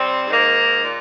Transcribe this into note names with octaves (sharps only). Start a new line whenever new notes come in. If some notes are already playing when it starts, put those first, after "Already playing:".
Already playing: C3 G3 C4
G#2 D#3 A#3
A#2